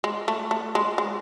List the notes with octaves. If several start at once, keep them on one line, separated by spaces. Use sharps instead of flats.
G#3
A3
A3
G#3
G#3